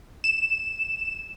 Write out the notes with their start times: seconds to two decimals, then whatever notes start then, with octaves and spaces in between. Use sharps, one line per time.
0.24 E7